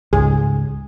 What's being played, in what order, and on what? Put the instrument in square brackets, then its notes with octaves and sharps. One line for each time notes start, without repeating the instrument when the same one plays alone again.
[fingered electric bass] C#2 G#2 [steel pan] G#4